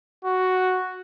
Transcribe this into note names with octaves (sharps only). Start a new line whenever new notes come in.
F#4